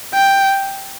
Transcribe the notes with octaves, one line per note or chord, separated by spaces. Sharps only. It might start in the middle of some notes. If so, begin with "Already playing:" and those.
G5